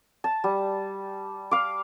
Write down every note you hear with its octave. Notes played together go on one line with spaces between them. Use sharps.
A5
G3
F5 D6